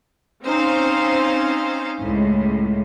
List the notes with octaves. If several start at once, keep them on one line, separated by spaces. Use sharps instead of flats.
C4 C#4 D#4 C5 F5 C6
C#2 A2